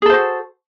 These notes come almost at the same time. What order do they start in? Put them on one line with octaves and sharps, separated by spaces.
G#4 A4 C5 F#4